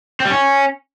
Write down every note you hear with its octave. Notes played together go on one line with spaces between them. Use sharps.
C4
G3
C#4